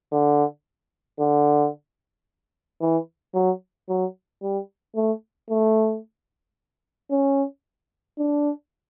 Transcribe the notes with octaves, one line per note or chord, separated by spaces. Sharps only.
D3
D3
E3
F#3
F#3
G3
A3
A3
C#4
D4